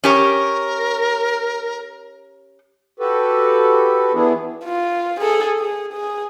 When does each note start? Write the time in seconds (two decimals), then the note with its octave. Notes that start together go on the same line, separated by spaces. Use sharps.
0.04 C#4 G4 A#4 C#5
3.00 F#4 G4 A4 B4
4.14 E3 B3 D4 E4 G#4
4.64 F4
5.20 G#4 A4
5.59 G#4
5.93 G#4